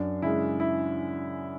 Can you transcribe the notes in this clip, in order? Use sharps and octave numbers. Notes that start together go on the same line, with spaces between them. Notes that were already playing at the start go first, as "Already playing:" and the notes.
Already playing: F#2 D4
C#3 G#3 E4
E4